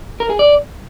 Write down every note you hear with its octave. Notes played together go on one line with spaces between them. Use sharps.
A#4
G#4
D5